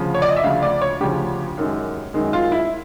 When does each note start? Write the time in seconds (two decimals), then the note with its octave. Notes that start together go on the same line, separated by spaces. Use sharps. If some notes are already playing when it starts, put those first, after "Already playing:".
Already playing: D2 C#3 F3
0.15 C#5
0.22 D5
0.29 D#5
0.36 E5
0.44 D2 C#3 F3 F5
0.63 D5
0.82 C#5
1.00 D2 C#3 F3 G4
1.58 F#2 D#3 G#3
2.14 F#2 D#3 G#3
2.33 F4
2.52 E4